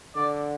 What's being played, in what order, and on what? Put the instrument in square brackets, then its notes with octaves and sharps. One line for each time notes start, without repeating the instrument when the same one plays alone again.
[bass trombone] D3 [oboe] D5